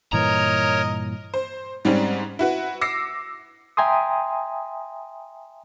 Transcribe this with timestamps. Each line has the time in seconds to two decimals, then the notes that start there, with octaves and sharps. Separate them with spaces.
0.13 G2 A#2 E3 A#4 C#5 D#5 A#5
1.34 C5
1.85 G#2 G3 C4 C#4
2.39 E4 F#4 B4
2.81 D6 E6 A#6 C7 C#7
3.77 E5 G5 G#5 A#5 C6 D#6